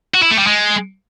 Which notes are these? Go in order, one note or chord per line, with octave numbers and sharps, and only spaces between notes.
F#4
E4
A3
G3
G#3